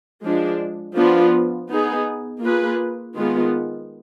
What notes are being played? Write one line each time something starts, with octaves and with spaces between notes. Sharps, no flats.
F3 G#3 D4
F3 B3 D4 F4
B3 D#4 G#4
A#3 F4 G#4 B4
D#3 G#3 B3 F4